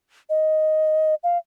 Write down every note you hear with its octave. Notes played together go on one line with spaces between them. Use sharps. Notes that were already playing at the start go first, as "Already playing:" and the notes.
D#5
F5